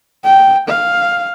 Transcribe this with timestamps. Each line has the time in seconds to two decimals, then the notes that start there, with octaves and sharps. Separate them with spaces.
0.24 G5
0.69 F5